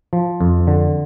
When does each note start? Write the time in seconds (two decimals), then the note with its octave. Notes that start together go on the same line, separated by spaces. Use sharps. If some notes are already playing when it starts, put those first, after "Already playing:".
0.13 F3
0.41 F2
0.67 D3